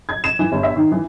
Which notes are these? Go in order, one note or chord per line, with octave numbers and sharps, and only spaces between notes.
G#6
E7
E3
G1
E5
D#3
E3